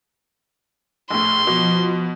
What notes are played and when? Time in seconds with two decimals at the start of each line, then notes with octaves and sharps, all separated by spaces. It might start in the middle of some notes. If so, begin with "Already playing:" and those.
1.10 A#1 A2 C6
1.47 B2 F3